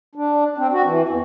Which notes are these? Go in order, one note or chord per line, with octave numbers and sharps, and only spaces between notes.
D4
C4
F#4
E3
E2